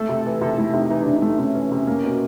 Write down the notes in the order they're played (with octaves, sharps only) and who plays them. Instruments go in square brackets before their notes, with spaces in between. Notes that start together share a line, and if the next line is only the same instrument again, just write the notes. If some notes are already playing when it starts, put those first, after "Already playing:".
Already playing: [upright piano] A3 [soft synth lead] A4
[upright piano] C3
E3
[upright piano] C3 [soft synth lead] A4
[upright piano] A3 [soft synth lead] E4
[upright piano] C3 [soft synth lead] D#4
[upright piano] E3 [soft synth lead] D#4
[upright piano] C3 [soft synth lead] D4
[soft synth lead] D#4
[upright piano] A3
[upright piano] C3 [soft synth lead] C#4
[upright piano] E3
C3
A#3
B2